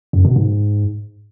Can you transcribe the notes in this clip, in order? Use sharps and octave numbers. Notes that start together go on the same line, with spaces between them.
F#2
B2
G#2